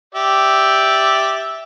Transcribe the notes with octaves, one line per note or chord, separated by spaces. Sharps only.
G4 D5 E5